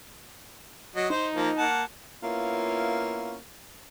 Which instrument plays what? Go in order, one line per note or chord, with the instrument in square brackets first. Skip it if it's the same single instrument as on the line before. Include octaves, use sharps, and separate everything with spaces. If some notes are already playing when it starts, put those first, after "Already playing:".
[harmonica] F#3 D#5
[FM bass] D#4 [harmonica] C5
[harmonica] F3 A#3
A#3 F#5 A5
[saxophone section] A#3 B3 C#4 E4 F4